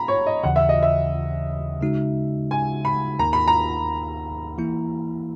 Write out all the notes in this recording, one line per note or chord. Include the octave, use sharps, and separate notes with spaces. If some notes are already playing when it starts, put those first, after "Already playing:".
Already playing: B2 A#3 D#4 A#5 B5
C#5
D#5
D#2 C#3 E3 F#5
E5
D#5
E5
C#3 G#3 D#4 F#4
G#5
B5
D#2 D#3 A#3 D#4 A#4 A#5
B5
A#5
E3 A#3 E4